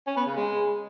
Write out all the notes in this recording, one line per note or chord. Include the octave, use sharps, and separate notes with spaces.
C#4
B3
C#3
G#3